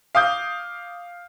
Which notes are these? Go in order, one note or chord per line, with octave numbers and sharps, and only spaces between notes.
F5 D6 D#6 G6